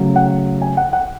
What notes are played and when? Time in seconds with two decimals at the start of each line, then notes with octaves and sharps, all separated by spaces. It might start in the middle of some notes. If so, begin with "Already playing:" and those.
Already playing: C#3 F#3 A3
0.16 F#5
0.62 G#5
0.77 F#5
0.93 F#5